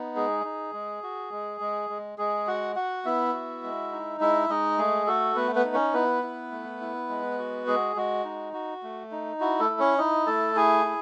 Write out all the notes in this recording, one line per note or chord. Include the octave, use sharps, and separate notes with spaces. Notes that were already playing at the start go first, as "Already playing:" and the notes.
Already playing: B3 D#4
G#3 G#4
D#4
G#3
F#4
G#3
G#3
G#3
G#3 G#4
F#4 F#5
F#4 F#5
B3 E4 E5
F#4
G#3
D#4
G#3 E4 E5
G#3 D#4 D#5
A3 G#4
A3 F#4 A4
A3 B3 B4
B3 B4
D#4
C#4 C#5
B3 E4 B4
E4
A3
E4
G#3
F#4
G#3 G#4
G#3 F#4
D#4
F#4
A3
D#4
E4 F#4
A3 A4
E4
C#4 C#5
D#4 E4 D#5
A3 A4 A5
E4 G#4 G#5
E4